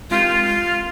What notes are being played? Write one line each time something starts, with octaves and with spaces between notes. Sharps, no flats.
G#3 C4 D#4 F4 G4 A#4